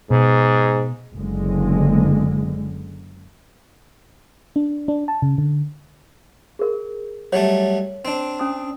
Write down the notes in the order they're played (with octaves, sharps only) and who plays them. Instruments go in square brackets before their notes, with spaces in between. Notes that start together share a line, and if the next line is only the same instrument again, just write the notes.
[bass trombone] G#2 [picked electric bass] B2
[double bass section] F#1 D3 G#3
[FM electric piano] D4
D4
A5
C#3
D3
[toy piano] G#4 A#4
[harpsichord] F#3 G3 A3 [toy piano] C#5
[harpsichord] C4 D4
[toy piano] C#4 D#6